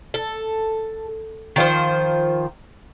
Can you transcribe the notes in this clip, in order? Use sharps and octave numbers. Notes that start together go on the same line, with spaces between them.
A4
D#3 F3 C5